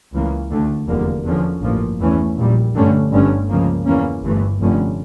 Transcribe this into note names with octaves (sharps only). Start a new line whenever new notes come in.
C#2 C#3 E3 A#3 C#4
D2 D3 A3
F1 E2 D3 G3 A#3
E2 D3 F3 C#4
A1 G2 F3 A#3
E2 E3 A3 C#4
A#1 A#2 G3
G2 D3 A3 C#4
G1 G2 D3 A3 C#4
C#2 C#3 F3 A#3
E2 E3 A#3 C#4
G1 G2 E3 A3
F1 F2 D3 A3 C#4